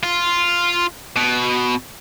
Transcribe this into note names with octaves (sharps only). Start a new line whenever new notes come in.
F4
B2